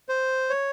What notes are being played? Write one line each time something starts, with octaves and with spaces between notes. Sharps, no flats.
C5
C#5